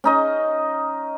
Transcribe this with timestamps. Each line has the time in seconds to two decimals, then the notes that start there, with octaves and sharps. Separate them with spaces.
0.04 C#4 D#4 D#5